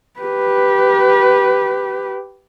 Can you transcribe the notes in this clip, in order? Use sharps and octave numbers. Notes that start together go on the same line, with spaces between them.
G4 B4